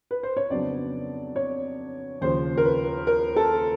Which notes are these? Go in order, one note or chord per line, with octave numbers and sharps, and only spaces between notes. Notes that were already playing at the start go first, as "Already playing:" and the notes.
B4
C5
C#5
F2 C#3 F#3 B3 D4 D5
C#5
D#2 C#3 F3 C5
A#4
B4
A#4
A4